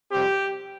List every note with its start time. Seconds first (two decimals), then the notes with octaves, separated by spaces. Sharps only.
0.12 F2 C3 G3 C4 G4